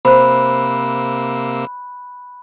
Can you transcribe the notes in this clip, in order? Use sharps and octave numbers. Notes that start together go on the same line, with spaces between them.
C3 A#3 C5 B5 E6 F#6